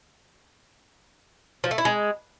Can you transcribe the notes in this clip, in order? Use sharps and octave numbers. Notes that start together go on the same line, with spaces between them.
F3
A3
E4
G#3